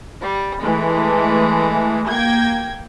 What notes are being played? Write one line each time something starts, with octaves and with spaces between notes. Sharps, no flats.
G3
E3 G#3 A3
A#3 G5 G#6